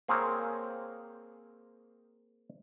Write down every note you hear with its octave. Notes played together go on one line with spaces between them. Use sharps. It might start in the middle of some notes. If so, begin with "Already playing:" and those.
A#3 C4 G#4 A#4 C#5